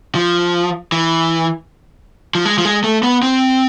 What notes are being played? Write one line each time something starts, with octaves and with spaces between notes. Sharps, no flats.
F3
E3
F3
G#3
F3
G#3
A3
B3
C4